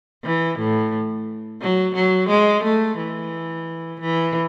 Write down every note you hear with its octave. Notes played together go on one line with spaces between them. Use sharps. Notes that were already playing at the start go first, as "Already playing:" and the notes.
E3
A2
F#3
F#3
G#3
A3
E3
E3